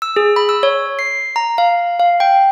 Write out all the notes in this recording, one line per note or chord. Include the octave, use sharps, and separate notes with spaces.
E6
G#4
B5
E6
C#5
C7
A#5
F5
F5
G5